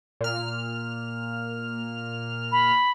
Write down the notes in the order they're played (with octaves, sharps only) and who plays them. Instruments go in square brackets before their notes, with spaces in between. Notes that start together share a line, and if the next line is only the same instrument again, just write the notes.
[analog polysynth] A#2 F6
[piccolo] B5